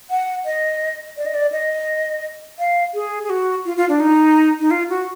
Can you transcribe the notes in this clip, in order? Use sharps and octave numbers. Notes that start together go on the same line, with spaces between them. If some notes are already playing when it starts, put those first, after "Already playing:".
F#5
D#5
D5
D#5
D5
D#5
F5
G#4
G#4
F#4
F4
F4
D4
D#4
D#4
F4
F#4